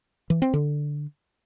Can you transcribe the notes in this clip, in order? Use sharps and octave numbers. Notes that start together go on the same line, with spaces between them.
E3
C4
D3